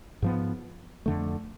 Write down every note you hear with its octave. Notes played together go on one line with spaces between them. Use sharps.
G#2 F3 B3
F2 D3 A3